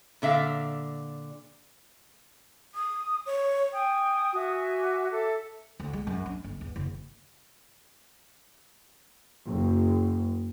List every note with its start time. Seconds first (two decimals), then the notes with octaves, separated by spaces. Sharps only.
0.22 A#2 D3 E5 F5
2.75 D#6
3.26 C#5
3.73 G5 G#5 D#6
4.33 F#4 E5 G#5
4.78 D6
5.12 A4 E5
5.80 D2
5.93 G#3
6.07 F#2
6.26 D4
6.44 G1
6.61 E2
6.76 F#1
9.46 F#1